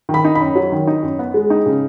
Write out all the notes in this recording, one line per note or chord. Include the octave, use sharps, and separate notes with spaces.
D#3
B5
D#4
F#2 B5
F#3
D#3
D#4
F#2
B3
G#3
D#4
C#3